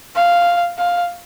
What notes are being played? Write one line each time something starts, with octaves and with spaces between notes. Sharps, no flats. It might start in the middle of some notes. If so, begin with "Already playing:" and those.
F5
F5